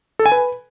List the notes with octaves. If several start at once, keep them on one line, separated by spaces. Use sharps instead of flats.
A4
G#5
B4